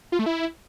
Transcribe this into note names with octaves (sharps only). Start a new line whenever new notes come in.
F4
A3
E4